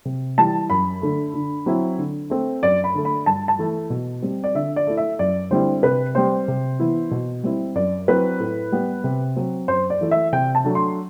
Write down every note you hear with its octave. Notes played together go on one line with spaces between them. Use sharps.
C3
E3 G3 A5
F#2 B5
D3 A3
D3
F#3 C4 E4
D3
A3 C4
F#2 D5
B5
D3 A3
B5
G2 A5
A5
E3 A3 E4
B2
G3 C4
D5
D3 E5
D5
A3 E4
E5
F#2 D5
D3 G3 C4 E4 C5
C3 B4
G3 C4 C5
C3
E3 B3 E4
B2
G3 C4 E4
F#2 D5
F#3 C4 E4 B4
A2
G3 B3
C3
F#3 C4
F#2 C5
D5
E3 A3 E4
E5
C3 G5
A5
F#3 A3 D4
C6